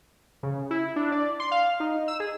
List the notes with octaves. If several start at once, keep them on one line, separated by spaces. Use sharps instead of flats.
C#3
E4
D4
D5
C6
F5
D#4
E6
G#4